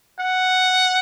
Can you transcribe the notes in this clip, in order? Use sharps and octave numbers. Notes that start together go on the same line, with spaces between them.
F#5